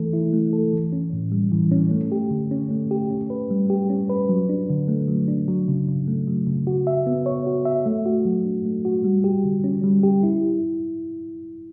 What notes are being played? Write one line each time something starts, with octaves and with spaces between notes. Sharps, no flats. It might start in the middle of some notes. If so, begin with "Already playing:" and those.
Already playing: E3 A3 A4
E4
A3
A4
E3
C#4
A2
G3
E3
C#4
A3
G4
D3
C#4
A3
G4
C#4
B4
G3
G4
C#4
B4
F#3
D4
D3
A3
F#3
D4
F#3
C#3
C#3
A3
F#3
C#3
F#4
E5
B3
C#5
F#4
E5
A3
F#4
F#3
D4
A3
F#4
G3
G4
D3
C#4
G3
G4
E4